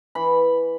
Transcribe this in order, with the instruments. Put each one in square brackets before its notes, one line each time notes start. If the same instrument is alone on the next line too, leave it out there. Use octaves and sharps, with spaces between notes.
[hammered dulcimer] E3 B5